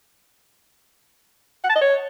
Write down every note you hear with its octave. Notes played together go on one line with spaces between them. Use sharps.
F#5
A5
D#5
C#5